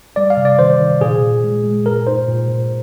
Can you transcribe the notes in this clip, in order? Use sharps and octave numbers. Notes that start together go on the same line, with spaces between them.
G3 D5
F5
C3
D5
D#3 C5
D#3
A#2 G#4
A#2
G#3
G#3
A#2 A#4
D#4 C5
A#2
A#2